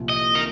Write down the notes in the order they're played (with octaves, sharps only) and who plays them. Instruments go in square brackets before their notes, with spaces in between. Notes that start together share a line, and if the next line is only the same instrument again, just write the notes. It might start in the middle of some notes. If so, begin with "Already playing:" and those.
Already playing: [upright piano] C2 A#2 F3
[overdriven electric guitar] D#5
A#4